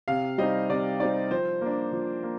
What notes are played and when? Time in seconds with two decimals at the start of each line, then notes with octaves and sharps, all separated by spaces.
0.08 C3 F5
0.38 G3 C4 D#4 D#5
0.69 C3 D5
1.00 G3 C4 D#4 D5
1.31 F3 C5
1.61 A#3 D4
1.93 F3
2.23 A#3